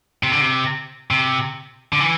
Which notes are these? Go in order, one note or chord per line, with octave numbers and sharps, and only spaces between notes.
C3
D3
C3
C3
D3
E3